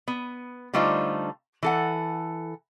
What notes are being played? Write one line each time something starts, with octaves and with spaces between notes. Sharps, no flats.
B3
D3 G3 A3 D#4 F4 C5
E3 A4 F#5